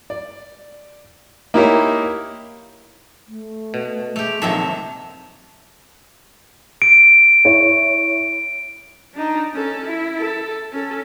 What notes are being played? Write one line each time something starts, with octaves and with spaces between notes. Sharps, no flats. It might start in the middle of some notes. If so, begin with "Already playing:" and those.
D5
A#3 D#4 E4 G4 A#4 C#5
A3
B2
G#3 A3 G4 F7
A#1 F2 C3 D#3 F#3 C4 E5 A5
D7
E4 C#5
D4 D#4
C#4 A4
E4
A4
C#4 A4